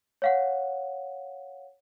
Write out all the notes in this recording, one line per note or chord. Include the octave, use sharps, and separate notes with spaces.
C#5 F5 F#5